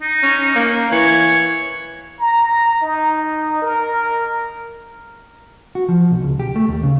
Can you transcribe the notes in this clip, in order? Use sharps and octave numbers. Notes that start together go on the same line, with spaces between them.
D#4
C#4
A#3
E3 C#5
A#5
D#4
A#4
F#4
F3
B1
C#2
G4
A3
D#2
C#3